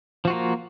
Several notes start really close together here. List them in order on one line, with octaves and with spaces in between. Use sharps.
F3 F#4 F4 A#3